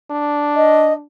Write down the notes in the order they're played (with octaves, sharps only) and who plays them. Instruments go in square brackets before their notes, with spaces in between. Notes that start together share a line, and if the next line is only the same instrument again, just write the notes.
[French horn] D4
[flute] D#5